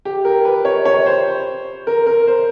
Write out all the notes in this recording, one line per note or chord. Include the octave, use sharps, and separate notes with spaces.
G4
A#4
B4
C#5
C#5
C5
A#4
A#4
C5